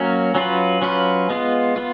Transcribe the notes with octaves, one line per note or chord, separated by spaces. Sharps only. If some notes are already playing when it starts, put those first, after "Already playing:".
Already playing: F#3 A#3 C#4
F#3 C#4 F4 B4
F#3 C#4 F4 B4
G#3 B3 F4
B3 F4